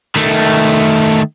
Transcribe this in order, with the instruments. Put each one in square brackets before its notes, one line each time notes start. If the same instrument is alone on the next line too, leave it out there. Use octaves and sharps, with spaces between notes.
[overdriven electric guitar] D#3 A3